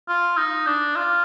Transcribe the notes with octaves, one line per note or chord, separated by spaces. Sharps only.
F4
D#4
D4
F4